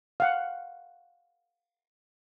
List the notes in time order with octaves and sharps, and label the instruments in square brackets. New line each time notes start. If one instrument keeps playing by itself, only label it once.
[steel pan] F5 F#5